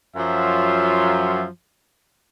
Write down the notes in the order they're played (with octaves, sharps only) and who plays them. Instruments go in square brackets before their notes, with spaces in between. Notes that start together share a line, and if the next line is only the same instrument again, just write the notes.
[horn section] F#2 F3 F#3 F4 E5